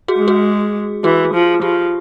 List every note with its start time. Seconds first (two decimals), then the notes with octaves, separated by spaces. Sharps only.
0.08 F#4 G#4
0.18 G#3
0.28 F#4 G#4
1.04 E3 F#4 G#4
1.34 F3
1.62 F3 F4 G4